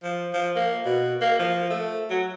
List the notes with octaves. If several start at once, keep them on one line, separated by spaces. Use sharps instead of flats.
F3
F3
A#3
B2
A#3
F3
A3
F#3